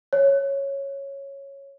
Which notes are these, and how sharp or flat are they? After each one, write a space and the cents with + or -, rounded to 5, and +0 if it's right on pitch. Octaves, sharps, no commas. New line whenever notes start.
C#5 -5